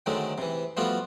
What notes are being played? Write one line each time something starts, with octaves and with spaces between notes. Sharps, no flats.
D3 D#3 F#3 G#3 A3 C4
C3 E3
F3 G3 A3 B3 F4 F#4